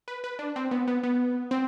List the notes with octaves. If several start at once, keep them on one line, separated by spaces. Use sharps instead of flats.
B4
B4
D4
C4
B3
B3
B3
C4